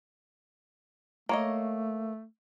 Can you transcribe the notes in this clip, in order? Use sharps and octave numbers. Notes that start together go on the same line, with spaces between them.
A3 A#3 C#5 D#5